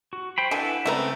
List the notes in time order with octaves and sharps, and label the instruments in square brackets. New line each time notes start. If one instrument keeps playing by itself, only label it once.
[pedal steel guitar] F#4
C5 G5 B5
[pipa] D3 G#5 [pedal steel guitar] E4 B4
[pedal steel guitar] C#3 G#3 C4 [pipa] A3 B4 A#5